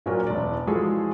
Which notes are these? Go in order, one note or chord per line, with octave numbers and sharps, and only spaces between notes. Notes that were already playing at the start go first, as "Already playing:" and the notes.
A#2 F#3 C#4 D4 A#4
E1 D5
E3 F3 G#3 F#4 G#4 A4